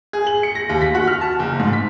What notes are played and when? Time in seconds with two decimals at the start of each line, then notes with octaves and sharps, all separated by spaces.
0.13 G#4
0.27 F#7
0.43 C#7
0.55 A#6
0.69 D#2
0.81 B6
0.95 F#4
1.07 F6
1.21 A5
1.39 F#1
1.60 G#2
1.73 B6